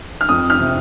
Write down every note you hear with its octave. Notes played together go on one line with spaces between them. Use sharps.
F6
F2 D#6
F6
C3